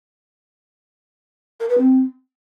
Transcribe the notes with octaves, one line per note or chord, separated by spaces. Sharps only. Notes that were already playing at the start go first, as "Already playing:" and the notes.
A#4
B4
C4